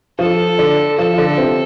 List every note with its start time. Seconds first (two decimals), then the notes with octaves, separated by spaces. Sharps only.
0.19 F3 F4 A4
0.59 D3 D4
0.98 F3 F4 A4
1.13 F4
1.18 D3 D4
1.38 C3 C4